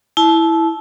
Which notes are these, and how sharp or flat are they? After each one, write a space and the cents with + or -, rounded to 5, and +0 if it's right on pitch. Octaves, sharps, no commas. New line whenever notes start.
E4 +0 A5 -25